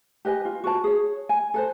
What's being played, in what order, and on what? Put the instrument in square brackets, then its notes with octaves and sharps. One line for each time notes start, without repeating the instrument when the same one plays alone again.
[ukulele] G4 B4 D#5 G#5
F4
F#4 B4 A5
G#4 C#5
G#5
A4 B4 C5